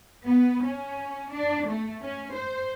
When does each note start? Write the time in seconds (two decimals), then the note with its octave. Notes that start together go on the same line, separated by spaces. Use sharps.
0.24 B3
0.64 C#4
1.30 D4
1.67 A3
2.03 C#4
2.33 C5